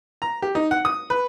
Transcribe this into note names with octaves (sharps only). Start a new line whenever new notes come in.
A#5
G4
D#4
F#5
D#6
B4